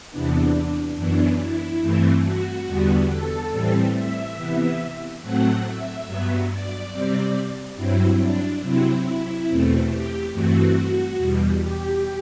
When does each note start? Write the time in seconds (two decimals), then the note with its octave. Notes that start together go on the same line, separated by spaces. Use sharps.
0.11 E2 C3 E3 B3 D4
0.96 F#2 E3 B3 D4
1.38 E4
1.81 G2 E3 A3 C4
2.23 F#4
2.66 E2 D3 G3 B3
3.09 A4
3.51 A2 E3 G3 C4
3.94 E5
4.36 C3 E3 B3
5.21 A2 F#3 A3 C4 F#5
5.65 E5
6.06 G2 F#3 B3
6.49 D5
6.92 C3 G3 C4
7.76 G2 F#3 C4 E4
8.19 D4
8.62 C3 F#3 C4 E4
9.47 E2 B2 A3 C4
9.89 G4
10.32 G2 E3 A3 C4 F#4
11.17 E2 B2 G3
11.60 G4